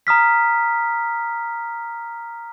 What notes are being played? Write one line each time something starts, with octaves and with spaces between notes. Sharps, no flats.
A#5 D#6 F6 B6